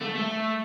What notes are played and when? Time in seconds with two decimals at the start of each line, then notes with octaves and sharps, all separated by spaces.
0.02 A3
0.16 A3